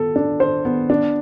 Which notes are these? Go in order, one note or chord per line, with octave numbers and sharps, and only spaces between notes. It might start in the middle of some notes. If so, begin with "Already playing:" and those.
Already playing: B3 A4
D4
C5
B3
D4